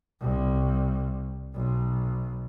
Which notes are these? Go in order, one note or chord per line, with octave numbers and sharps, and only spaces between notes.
C2
B1